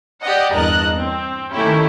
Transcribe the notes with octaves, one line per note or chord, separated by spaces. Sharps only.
G4 D5 D#5 F#5
E2 G2 A#4 D#5 A5 F#6
C4
D#3 A3 C#4 E4 G4